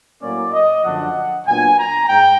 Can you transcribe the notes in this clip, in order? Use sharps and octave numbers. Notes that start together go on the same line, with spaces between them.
A2 F#3 A#3 C#4 D5
D#5
F#2 D3 F3 A3 D4 F#5
A#2 F#3 B3 D4 G#5
A#5
G#2 G5